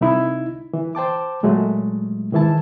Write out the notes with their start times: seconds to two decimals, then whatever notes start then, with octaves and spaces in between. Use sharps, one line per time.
0.01 C2 D#4 E4
0.73 E3
0.95 C5 G5 A5 D6
1.43 A#2 F#3 G#3 A3
2.32 G#2 D#3 E3 E4 A5